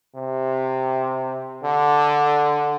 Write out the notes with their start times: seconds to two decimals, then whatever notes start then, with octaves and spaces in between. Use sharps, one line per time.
0.15 C3
1.64 D3